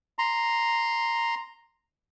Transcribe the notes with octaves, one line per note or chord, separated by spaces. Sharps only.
A#5 C6